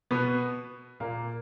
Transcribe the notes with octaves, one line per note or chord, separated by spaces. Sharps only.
B2 B3
A#2 A#3